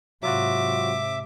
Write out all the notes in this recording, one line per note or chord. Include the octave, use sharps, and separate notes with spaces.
G#2 C3 F#3 F4 F#4 E5 D6